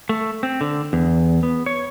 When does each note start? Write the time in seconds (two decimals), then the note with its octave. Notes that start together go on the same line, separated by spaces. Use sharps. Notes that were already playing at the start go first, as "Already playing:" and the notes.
0.09 A3
0.43 C4
0.61 D3
0.93 E2
1.43 B3
1.66 C#5